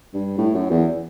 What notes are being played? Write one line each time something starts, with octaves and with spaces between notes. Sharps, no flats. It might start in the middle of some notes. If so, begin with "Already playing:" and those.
G2
A2
F#2
E2